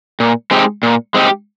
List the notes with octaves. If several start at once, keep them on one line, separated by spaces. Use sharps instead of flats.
A#2
G#3 C4 D#4 G4
A#2
G#3 C4 D#4 G4